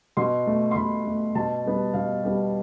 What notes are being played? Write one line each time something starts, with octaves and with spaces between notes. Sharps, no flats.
B2 C6
A3
C6
B2 B5
A3
B2 A5
G3 B3
B2 F5
G3 B3